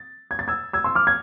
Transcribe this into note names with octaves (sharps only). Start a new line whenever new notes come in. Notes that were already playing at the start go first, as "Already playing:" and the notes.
Already playing: A6
G#6
A6
E6 G#6
E6 G#6
C6 E6
D6 F6
G#6